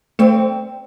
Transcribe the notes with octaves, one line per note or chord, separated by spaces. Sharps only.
A3 C4 A4